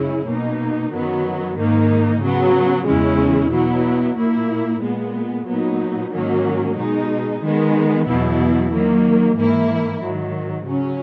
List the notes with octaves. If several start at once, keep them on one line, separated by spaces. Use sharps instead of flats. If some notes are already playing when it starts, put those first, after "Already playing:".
Already playing: F#2 C#3 G#3 C#4 E4
B2 A#3 D#4
F#2 D#3 F#3 B3
G#2 D#3 A#3 D#4
C#3 F#3 B3
E2 C#3 G#3 C#4 E4
B2 F#3 B3 E4
A#2 A#3 E4
A#2 G#3 B3
A#2 F#3 B3 D#4
G#2 D#3 F#3 A#3 C#4
B2 G#3 D#4
D#3 G#3 B3
E2 B2 F#3 B3 E4
D#3 F#3 A#3
G#2 E3 A#3 E4
G#2 D#3 F#3
C#3 F#3 C#4